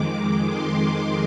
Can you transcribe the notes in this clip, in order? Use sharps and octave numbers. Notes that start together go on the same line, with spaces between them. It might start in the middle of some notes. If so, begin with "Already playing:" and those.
Already playing: F2 D#3 G#3 D6
C6